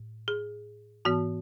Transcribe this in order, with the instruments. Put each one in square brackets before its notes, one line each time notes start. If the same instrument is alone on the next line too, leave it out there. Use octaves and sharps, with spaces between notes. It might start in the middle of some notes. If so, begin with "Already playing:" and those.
Already playing: [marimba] A2
G#4
G#2 E3 B3 F#4